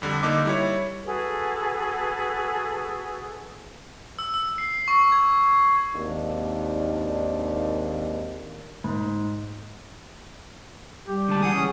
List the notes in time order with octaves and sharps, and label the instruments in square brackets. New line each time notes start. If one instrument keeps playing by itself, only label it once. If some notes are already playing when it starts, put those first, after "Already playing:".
[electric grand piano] F2 D3 G3
D3 A#3 D#4 D6
G3 E4 C#5
[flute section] F#4 G#4 A4 B4
[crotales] E6
E6
C7
C#6
G#6
[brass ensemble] G#1 D#2 D4
[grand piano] G#2
[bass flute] G3 [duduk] G4
[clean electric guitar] D3 G#3 A5
[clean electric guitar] C#2 E3 F#5 [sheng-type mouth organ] G#4 D#6
[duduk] C#4